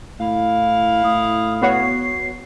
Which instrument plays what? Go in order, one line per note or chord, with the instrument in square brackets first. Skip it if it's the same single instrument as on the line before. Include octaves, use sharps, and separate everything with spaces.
[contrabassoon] A2 [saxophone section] E4 F5
[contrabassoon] A2 [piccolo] D#6
[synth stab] B3 F#4 C#5 [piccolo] C7